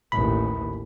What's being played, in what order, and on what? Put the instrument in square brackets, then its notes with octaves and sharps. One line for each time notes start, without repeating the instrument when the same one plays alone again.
[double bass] A1 D#2 [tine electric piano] B5